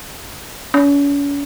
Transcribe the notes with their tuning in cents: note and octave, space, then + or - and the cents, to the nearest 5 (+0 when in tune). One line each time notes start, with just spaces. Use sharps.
C#4 +40